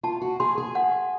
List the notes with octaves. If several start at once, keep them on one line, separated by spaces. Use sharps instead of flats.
F4 A5
F#4
G#4 C6
G#4
F#5